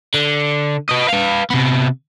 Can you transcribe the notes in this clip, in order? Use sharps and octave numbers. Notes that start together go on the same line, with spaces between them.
D3
B4 D#5
B4 F5
C3 B3